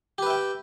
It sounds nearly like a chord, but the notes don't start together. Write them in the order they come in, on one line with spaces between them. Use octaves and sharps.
G4 B4 E5 G5